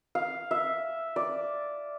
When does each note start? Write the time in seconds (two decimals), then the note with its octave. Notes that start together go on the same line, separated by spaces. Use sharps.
0.15 F5
0.51 E5
1.16 D5